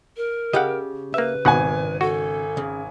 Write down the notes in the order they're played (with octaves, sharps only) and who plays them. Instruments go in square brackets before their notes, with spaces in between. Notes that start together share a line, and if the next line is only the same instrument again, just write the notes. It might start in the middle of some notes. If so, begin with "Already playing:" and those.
[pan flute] A#4
[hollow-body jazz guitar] C#3 G4 F5 [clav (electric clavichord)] D#5 F#5
[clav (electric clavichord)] A#3 E5 [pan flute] B4
[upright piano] G#1 G#5 [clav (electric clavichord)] B2 F#5
[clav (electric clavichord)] F#4 [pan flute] A4
[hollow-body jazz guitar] C#3